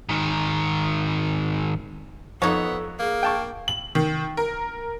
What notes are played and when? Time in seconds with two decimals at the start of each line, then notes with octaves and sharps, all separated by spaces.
0.09 G#2 D#3
2.42 F2 B3 D#4 A4 C#5
3.00 A#3 G#4
3.23 G5 A5 C#6
3.68 F#7
3.95 D#3
4.37 A#4